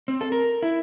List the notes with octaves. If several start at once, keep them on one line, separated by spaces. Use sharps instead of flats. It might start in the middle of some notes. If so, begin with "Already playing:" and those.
C4
A4
A#4
E4